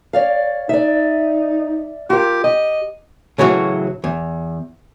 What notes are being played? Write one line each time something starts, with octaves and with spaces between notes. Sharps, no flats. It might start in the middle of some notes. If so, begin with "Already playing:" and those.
C#5 D5 F5
D#4 D5 E5
F4 G4 A#4
G4 D#5
A2 C#3 E3 F#3 F#4
E2